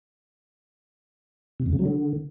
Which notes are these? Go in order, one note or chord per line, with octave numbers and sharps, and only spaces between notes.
C3
F2
C#3
F#3
D3